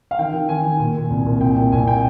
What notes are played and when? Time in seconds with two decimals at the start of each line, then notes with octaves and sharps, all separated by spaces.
0.11 F5
0.19 D#3 G5
0.33 D#3
0.49 D#3 G#5
0.64 D#3
0.80 A#2
0.95 A#2
1.10 C2
1.26 A#2
1.41 C2 G5
1.56 A#2
1.72 C2 G#5
1.87 G5